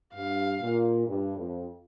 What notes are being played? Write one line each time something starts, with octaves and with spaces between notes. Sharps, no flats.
G2 F5
A#2
G2
F2